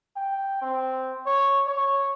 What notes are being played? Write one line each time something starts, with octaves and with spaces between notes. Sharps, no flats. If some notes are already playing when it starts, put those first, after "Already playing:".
G5
C4
C#5
C#5